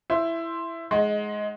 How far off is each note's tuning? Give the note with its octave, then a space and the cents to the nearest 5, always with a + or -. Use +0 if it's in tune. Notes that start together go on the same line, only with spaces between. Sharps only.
E4 +10 C5 +0
G#3 +15 D#4 +0 F#5 -10